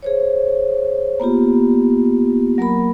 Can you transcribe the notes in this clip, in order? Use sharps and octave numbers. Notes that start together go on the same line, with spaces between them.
G#4 C5 C#5
A#3 B3 F4 G4
F#3 A#3 A#4 B5